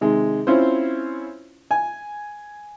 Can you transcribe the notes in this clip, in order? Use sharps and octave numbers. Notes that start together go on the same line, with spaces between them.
C3 D#3 G#3
C4 C#4 E4 F4 C5
G#5